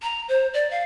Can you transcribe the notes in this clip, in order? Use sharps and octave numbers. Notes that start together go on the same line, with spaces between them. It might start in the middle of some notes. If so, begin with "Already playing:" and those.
A#5
C5
D5
F5